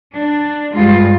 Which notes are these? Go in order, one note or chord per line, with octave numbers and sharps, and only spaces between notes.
D4
G2 G3 G#3 F4